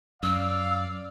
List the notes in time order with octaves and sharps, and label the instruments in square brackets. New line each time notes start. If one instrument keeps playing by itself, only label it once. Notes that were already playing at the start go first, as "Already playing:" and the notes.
[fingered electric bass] F#2 [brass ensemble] D5 F5 [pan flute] E6